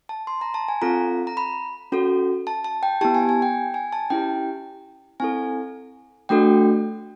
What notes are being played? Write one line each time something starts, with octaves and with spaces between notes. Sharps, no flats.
A5
C6
A#5
A5
G#5
C4 F4 A4 A#5
A#5
B5
C#4 F#4 A4
A5
A5
G5
B3 E4 G4 A5
G#5
G#5
G5
G#5
A5
C#4 E4 G4 G5
C4 E4 A4 G#5
A3 D4 F#4 A4 G5